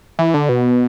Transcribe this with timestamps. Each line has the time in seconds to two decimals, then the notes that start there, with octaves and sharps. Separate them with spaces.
0.19 E3
0.34 D3
0.49 B2